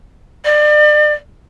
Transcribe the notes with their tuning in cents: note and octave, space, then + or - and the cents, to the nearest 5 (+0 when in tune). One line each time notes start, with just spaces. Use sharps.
D5 +35